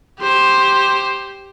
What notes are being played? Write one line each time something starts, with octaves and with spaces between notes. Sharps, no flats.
G4 C5